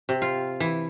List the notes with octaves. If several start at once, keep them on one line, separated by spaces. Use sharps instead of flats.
C3
F4
E3